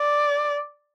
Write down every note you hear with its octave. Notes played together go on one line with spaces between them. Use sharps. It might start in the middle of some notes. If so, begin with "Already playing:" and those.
Already playing: D5